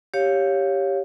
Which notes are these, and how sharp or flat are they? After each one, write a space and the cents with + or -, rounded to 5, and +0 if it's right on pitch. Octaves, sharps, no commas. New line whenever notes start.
G4 +0 C#5 +0 F5 +5